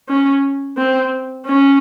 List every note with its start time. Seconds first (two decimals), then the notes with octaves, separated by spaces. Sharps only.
0.08 C#4
0.77 C4
1.46 C#4